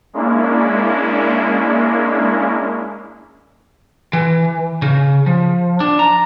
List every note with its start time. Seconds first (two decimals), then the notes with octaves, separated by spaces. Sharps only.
0.13 G#3 A#3 C#4 D4 E4
4.13 E3
4.82 C#3
5.26 F3
5.80 D4
5.99 A#5